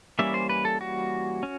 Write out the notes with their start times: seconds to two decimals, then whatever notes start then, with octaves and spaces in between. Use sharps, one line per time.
0.19 E3 G3 A#3 C#4 E5
0.34 C5
0.49 B4
0.65 A4
0.81 F#4
1.43 C#4